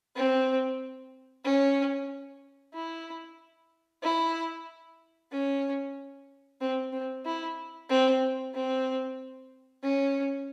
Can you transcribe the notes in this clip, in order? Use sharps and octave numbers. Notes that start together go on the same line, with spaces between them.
C4
C#4
E4
E4
C#4
C4
C4
E4
C4
C4
C#4